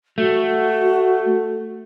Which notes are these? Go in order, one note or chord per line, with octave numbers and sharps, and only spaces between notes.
A3 F#4